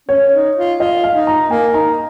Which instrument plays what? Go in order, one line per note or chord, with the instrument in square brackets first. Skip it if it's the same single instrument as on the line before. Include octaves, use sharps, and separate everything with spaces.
[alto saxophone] C#4 [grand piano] C#5
[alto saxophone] D#4
F4
[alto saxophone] F4 [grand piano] D#5
[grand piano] F5
[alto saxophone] D#4
[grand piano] A#5
[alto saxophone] A#3 [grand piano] G#5
[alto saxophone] D#4 [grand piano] A#5